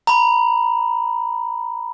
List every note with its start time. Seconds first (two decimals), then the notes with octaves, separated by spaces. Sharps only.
0.07 A#5 B5